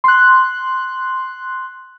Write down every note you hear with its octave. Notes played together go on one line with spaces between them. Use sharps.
C6 F#6